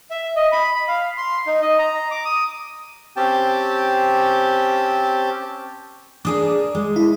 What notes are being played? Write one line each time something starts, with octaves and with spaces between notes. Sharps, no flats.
E5
D#5
B5
B5
F5
C6
D#4
D#5
A#5
D6
D#6
C4 C#4 G4 G5 A5
D4 G#4 A#4 D6 D#6
G#3
E4